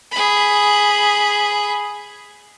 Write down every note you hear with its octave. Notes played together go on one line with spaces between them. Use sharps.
G#4 B5